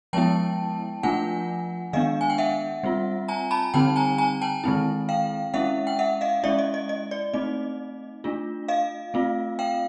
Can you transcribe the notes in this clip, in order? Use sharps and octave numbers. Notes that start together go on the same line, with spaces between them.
F3 G#3 B3 E4 G5 A5
F3 A3 D4 F4 F#5 G#5
D#3 G#3 B3 D4 D#5 F5
G#5
G5
E5 F#5
G3 C4 F4
G#5 A#5
A5 B5
D3 G3 C4 D#4 G5 A5
G#5 A#5
G#5 A#5
G5 A5
D#3 G#3 C4 E4
F5 G5
G#3 C#4 E4 E5 F#5
G5
E5 F#5
D#5 F5
G#3 C#4 E4 D5 E5
D#5
D#5
D#5
D5
A3 C4 D#4 D#5
A3 D4 F4
D#5 F5
A3 C4 F4
F5 G5